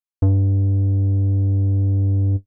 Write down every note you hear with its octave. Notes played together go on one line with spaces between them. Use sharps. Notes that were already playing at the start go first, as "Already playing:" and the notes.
G2